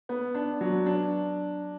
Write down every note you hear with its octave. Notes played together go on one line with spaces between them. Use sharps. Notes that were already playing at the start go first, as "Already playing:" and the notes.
B3
D4
F#3
D4